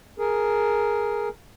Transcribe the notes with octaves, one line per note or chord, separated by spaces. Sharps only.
G#4 A#4